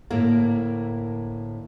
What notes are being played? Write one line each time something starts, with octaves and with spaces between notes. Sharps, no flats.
D2 A2 A#3 E4 A#4